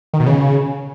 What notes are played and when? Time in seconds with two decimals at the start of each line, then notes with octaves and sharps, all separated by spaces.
0.13 D#3
0.20 B2
0.26 C#3